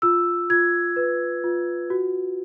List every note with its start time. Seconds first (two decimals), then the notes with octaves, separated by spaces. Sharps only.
0.02 F4 E6
0.50 F4 G#6
0.96 B4
1.44 F4
1.90 F#4